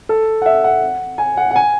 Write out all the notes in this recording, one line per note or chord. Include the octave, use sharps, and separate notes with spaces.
A4
F#5
E5
F#5
G#5
F#5
F#5
G#5